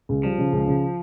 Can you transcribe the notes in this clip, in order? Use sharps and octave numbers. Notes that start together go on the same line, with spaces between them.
C#2
F3 G3
C#3
C#2
C#3